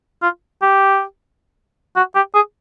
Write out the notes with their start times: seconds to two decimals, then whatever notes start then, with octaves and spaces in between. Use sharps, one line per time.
0.23 F4
0.62 G4
1.97 F#4
2.16 G4
2.35 G#4